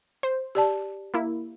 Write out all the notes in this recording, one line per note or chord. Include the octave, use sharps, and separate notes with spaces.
C5
G4 D5 A5
A#3 E4